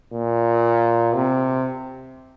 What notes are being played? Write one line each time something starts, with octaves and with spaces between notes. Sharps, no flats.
A#2
C3